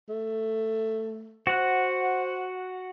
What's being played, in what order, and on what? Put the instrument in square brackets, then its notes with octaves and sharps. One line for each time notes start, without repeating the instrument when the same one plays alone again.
[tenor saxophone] A3
[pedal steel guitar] F#4 F#5 [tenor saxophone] C5